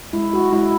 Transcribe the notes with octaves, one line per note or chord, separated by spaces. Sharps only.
G#3 E4
G#3 F#4
G#3 E4